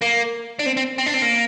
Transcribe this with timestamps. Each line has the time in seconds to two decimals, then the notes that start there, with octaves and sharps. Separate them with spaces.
0.02 A#3
0.59 D4
0.66 C4
0.77 C4
0.98 C4
1.06 D4
1.14 C4
1.22 A#3